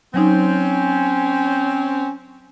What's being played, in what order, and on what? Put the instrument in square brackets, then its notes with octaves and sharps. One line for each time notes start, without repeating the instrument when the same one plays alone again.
[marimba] F#3 D#4 [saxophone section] C4 C#4